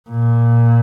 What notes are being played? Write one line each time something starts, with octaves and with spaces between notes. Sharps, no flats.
A#2